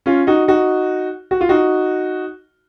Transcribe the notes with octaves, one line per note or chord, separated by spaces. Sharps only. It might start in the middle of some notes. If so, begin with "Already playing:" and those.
C#4 F4
D#4 F#4
D#4 F#4
F#4
F4
D#4 F#4